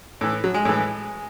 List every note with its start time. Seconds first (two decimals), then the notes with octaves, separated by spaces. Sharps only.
0.21 A2 E3
0.44 F#3
0.54 G#3
0.65 A2 E3 G#3